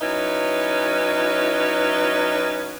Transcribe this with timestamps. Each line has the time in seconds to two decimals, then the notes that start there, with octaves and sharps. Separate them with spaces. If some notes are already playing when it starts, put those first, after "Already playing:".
0.01 F#3 C#4 D#4 E4 B4